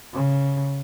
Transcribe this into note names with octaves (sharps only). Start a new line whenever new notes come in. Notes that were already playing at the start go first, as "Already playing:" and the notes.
C#3